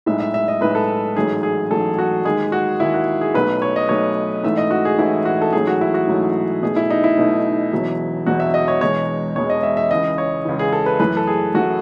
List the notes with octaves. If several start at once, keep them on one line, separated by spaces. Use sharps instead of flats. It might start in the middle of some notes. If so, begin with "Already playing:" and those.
B1 A2 G#3 E5
E5
E5
D#5
B1 A2 G#3 B4
A4
A1 G#2 F#3 A3 G#4
G#4
A1 G#2 F#3 A3 A4
F#4
D#2 D#3 G#3 G#4
F#4
D#2 D#3 G#3 E4
F#4
G#4
B1 B2 F#3 A3 B4
C#5
D#5
B1 B2 F#3 A3 C#5
A1 G#2 E3 A3 E5
D#5
F#4
G#4
A1 G#2 E3 A3 E4
F#4
A4
A1 G#2 F#3 A3 G#4
F#4
E4
F#4
A1 G#2 F#3 A3
B1 B2 A3 G#4
E4
D#4
E4
B1 B2 A3
E1 E2 B2 F#3
E1 E2 B2 F#3 F#4
E5
D#5
C#5
E1 E2 B2 G#3 C#5
E1 E2 B2 G#3 C#5
D#5
E5
E5
C#2 C#3 E3 D#5
C#5
C#2 C#3 E3
G#4
A4
B4
F#2 E3 A3 B4
A4
G#4
F#2 E3 A3 F#4